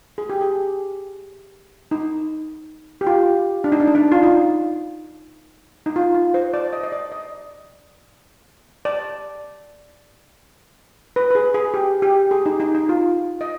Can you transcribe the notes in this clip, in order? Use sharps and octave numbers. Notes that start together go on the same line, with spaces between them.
G#4
G4
G#4
D#4
G4
F4
D4
D#4
D4
D#4
D4
F4
D#4
D#4
F4
F4
C5
D5
D#5
D#5
D5
D#5
D5
B4
B4
G#4
G#4
G4
G4
G#4
D#4
D#4
D#4
F4
D#5